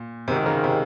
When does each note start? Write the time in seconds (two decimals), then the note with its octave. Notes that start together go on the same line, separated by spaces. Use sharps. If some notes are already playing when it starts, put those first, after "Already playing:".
Already playing: A#2
0.27 G#1 G#2 C3 D#3
0.46 C#3
0.64 C3